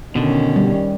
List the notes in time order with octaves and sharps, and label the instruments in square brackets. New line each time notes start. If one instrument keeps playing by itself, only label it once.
[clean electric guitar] B2 D3 [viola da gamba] D#3 C#4
[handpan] G3